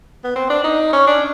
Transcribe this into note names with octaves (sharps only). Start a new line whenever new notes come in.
B3
C4
D4
D#4
C#4
D4